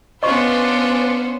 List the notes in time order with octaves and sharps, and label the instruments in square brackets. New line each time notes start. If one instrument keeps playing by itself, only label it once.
[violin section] B3 C#4 C5 [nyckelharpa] D4 F4 [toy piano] D#5 C#6